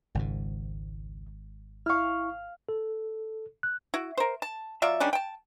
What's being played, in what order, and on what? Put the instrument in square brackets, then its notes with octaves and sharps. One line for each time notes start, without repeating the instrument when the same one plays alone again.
[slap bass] G#1 G#2 [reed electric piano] C#2
[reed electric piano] E4 C#6 [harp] F5 F6
[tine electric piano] A4
F#6
[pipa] E4 F#4
A#4 C5
A5
F#3 F4 D5 E5
D#3 G3 C#4 D4
G5 A5